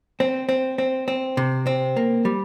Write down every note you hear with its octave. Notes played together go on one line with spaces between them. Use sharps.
C4
C4
C4
C4
C3
C4
A#3
G3